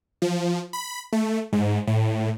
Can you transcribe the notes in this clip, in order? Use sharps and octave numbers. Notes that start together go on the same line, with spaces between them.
F3
B5
A3
G#2
A2